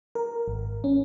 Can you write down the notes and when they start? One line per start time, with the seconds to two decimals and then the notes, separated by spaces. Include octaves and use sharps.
0.15 A#4
0.48 G#1
0.84 C#4